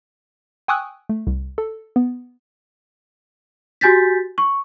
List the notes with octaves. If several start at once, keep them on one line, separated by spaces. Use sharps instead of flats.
G5 G#5 C#6 D#6 E6 F#6
A3
C2
A4
B3
F#4 G4 G#5 G6 A6 B6
C#6